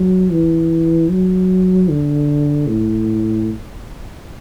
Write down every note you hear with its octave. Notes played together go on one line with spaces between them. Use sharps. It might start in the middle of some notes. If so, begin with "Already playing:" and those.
Already playing: F#3
E3
F#3
D3
A2